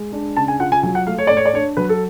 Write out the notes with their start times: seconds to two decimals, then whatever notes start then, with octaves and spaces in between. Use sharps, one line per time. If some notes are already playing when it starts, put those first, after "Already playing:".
Already playing: G#3
0.12 D4
0.37 C#3 A5
0.48 G#5
0.60 F4 F#5
0.72 G#5
0.83 F#3 G#5
0.95 F#5
1.07 A3 F5
1.18 C#5
1.27 A2 D5
1.37 C#5
1.46 D5
1.53 D4 C#5
1.77 F#3 B4
1.89 A4